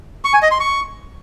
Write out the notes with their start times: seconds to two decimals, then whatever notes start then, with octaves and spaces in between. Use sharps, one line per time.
0.25 C#6
0.33 G#5
0.42 D#5
0.51 C6
0.60 C#6